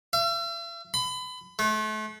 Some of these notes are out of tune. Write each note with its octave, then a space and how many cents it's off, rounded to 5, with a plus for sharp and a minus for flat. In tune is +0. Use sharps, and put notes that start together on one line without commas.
E5 +45
B5 +30
A3 -35